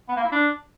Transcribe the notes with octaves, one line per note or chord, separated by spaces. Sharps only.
B3
A#3
E4
D4